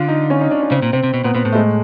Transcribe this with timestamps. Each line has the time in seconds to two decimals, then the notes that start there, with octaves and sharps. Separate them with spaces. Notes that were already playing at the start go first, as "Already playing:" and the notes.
Already playing: D3 F4
0.08 D#4
0.30 C#4
0.41 D#4
0.51 D4
0.62 C#4
0.71 C#3 C4
0.82 A#2
0.93 C3 C4
1.03 C3
1.14 B2
1.24 A#2 B3
1.35 A#2 B3
1.45 A2
1.52 A3
1.55 G#3